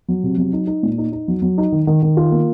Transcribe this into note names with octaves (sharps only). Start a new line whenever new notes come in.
F#3
C3
F#3
D#4
D#4
A#2
D#4
D#4
F#3
F#3
D#4
D#3
D#3
D#3
F4
A#3